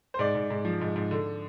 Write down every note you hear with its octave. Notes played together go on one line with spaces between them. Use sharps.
C5
G#2 D5
G#2
G#2
F3
G#2
G#2
D3